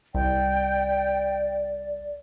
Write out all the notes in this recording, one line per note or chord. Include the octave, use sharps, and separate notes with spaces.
C2 D5 G5